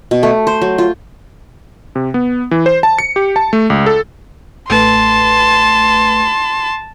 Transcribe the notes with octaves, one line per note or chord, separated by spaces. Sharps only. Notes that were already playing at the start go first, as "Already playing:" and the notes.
B2
A3
C5
F#3
F4
C3
B3
E3
C5
A5
C#7
G4
A5
A3
C#2
A4
A1 A3 B4 A5 C6